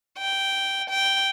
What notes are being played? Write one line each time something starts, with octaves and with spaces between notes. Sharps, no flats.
G5
G5